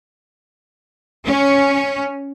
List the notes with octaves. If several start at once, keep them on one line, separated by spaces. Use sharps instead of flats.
C#4